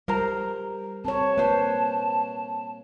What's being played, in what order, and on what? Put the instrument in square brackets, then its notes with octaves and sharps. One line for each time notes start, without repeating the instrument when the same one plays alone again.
[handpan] G3 [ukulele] A#4 C5 A#5
[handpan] C4 C#5 [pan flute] A5
[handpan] A#3 [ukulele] B4 C5